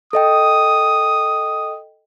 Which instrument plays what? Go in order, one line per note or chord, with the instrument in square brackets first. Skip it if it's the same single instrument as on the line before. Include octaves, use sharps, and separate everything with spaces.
[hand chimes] A4 D#5 G5 [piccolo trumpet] D#6